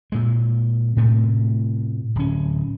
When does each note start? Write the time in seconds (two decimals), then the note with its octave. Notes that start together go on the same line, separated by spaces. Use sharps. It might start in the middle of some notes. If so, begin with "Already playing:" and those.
0.12 A#2 G#3
0.96 A2 C3 A3
2.16 D1 C#4